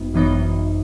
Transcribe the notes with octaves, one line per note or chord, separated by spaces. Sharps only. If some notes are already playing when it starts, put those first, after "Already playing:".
Already playing: G#1 F#2 B3 D#4
G#1 F#2 E3 B3 D#4